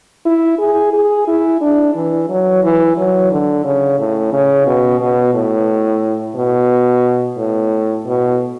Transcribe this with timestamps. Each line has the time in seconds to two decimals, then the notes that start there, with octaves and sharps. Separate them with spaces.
0.25 E4
0.59 G#4
0.93 G#4
1.27 E4
1.61 D4
1.95 E3
2.29 F#3
2.63 E3
2.97 F#3
3.31 D3
3.64 C#3
3.99 A2
4.32 C#3
4.66 B2
5.00 B2
5.34 A2
6.36 B2
7.37 A2
8.06 B2